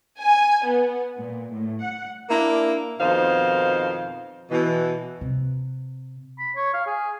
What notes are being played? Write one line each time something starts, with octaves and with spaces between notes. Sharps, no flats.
G#5
B3
A#2
A2
F#5
A#3 D4 E4
F2 B2 D#3 D#4 C5 F5
B2 E3
C3
B5
C#5
F5
G#4